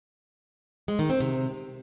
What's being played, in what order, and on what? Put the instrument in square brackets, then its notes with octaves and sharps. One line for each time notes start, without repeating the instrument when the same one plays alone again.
[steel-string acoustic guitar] G#3
D#3
C4
C3